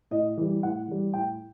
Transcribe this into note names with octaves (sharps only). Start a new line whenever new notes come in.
A2 D#5
E3 G3
A2 F#5
E3 G3
A2 G5